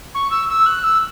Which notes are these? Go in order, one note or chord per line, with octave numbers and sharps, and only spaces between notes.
C#6
E6
E6
F#6
E6